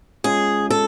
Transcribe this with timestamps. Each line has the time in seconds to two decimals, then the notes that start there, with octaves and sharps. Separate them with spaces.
0.24 G#3 C#4 F4 G#4
0.70 A4